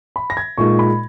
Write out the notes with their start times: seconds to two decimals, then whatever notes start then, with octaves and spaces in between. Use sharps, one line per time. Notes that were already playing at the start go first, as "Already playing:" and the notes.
0.16 B5
0.30 A#6
0.37 G#6
0.58 A#2 G#3 D#4 C#6
0.79 B5